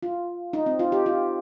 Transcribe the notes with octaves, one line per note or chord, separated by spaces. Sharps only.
F4
D#4
C4
F4
G4
F4